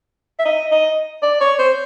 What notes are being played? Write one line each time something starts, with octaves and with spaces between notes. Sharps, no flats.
E5
D#5
D#5
D5
C#5
C5